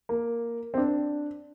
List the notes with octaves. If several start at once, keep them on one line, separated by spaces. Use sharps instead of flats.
A#3
C4
D4